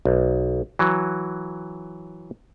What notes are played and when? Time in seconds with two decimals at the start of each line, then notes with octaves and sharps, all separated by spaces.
0.05 B1
0.79 E3 F#3